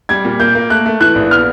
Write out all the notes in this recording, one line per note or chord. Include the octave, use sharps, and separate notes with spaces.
G3 G#6
A#2
A#3 G6
A#3
A3 F#6
A3
E3 F#6
A#1
B3 F6